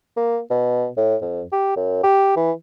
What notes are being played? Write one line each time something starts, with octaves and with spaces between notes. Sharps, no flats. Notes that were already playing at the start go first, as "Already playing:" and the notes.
A#3
B2
A2
F2
G4
F#2
G4
E3